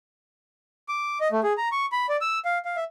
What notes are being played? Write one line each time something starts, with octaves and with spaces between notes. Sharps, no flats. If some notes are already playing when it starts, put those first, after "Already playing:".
D6
D#5
A3
G#4
A#5
C#6
B5
D5
E6
F5
F5
E5